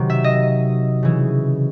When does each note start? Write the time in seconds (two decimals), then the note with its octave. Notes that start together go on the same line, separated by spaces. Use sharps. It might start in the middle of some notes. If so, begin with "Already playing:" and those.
Already playing: C3 D#3 F#3
0.10 E5
0.24 D#5
1.03 C#3 E3